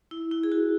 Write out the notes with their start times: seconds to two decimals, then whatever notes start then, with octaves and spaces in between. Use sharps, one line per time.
0.11 E4
0.31 E4
0.43 G#4
0.52 F#4